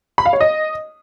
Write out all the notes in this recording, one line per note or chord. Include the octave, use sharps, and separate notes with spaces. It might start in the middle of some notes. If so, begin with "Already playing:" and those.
B5
F5
C#5
D#5